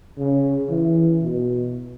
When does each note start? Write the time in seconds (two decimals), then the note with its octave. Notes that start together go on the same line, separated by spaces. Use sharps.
0.18 C#3
0.70 E3
1.22 B2